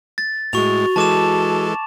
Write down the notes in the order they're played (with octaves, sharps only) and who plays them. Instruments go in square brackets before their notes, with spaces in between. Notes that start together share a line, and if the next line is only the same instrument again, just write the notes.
[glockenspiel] A6
[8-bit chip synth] A2 G#3 [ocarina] F#4 [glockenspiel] C#6 F7
[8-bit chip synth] E3 G#3 A4 [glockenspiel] A5 D6 E7